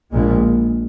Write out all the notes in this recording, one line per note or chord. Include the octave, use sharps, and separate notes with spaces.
A#1 A#2 G#3